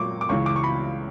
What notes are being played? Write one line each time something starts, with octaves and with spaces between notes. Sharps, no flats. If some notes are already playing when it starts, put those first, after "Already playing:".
Already playing: A#2 F#3 A#3 C#6 D6
D6
C#2 C#3 E3 C#6
D6
C#6
B5